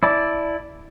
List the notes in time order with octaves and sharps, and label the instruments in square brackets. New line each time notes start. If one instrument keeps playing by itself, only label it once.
[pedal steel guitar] E4 D5 A5